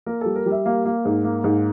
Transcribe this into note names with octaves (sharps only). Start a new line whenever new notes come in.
A#3 A#4
G3 A4
A#4
G3
E5
A#3 F5
A#3
G#2
A#3
G#2